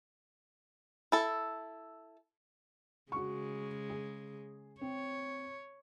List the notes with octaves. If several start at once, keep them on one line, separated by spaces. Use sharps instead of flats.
E4 A4
C#3 G#3 F#4 C#6
G#4
C4 C#5